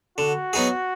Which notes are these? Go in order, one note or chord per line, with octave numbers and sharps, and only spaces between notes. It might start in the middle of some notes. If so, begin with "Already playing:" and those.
D3 F#4
F#3 B3 D#4 G#4